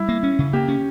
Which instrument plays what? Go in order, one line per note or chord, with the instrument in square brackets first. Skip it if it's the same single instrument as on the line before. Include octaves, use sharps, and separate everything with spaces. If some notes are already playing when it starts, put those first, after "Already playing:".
Already playing: [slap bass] G3 [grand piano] E4
[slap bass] A#3
C#4
C#3
[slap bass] A#3 [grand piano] G4
[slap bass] C#4